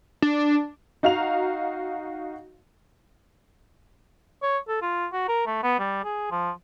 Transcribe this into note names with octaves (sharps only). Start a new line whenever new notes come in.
D4
D#4 F#4 F5 A#5 F7
C#5
A4
F4
F#4
A#4
A3
B3
G3
G#4
F3